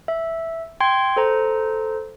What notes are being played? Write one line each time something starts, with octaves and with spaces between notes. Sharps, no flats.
E5
G5 C6 G#6
A4 C5 A#5